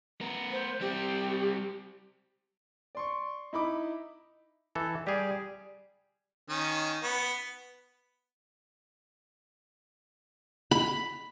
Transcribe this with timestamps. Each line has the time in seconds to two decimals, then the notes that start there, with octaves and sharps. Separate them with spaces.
0.21 B3 A#4
0.52 C5
0.81 G3 C4 G4
2.95 D5 C6 C#6
3.53 D#4 E4 B5 D6
4.75 E3 A4
5.07 G3 G4 G#4
6.49 D#3 C#4
7.03 B3
10.71 B5